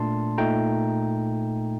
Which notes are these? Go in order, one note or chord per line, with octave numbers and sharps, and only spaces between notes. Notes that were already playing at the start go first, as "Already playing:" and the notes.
Already playing: A#2 A3 D4 A5 C6
A#2 A3 D#4 G5 A#5